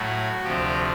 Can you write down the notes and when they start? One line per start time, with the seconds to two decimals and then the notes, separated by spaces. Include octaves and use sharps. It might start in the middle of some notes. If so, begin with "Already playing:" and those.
Already playing: A2 F#3 A3 F#4
0.44 D2 C3 F3 G4